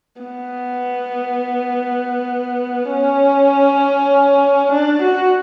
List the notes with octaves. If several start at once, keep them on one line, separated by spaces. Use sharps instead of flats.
B3
C#4
D4
F#4